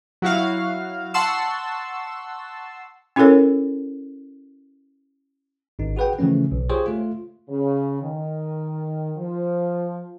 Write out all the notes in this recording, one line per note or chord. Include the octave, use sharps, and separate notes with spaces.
F#3 E4 F#4 F5
F#5 A5 C6 C#6 E6
C#4 E4 F#4 A4 A#4 C#5
G#1 D#4
F#4 G#4 B4 F#5 G5
C#3 E3 F3 A3 C#4
B1
F4 G4 G#4 C5 C#5
A3 F4
C#3
D#3
F3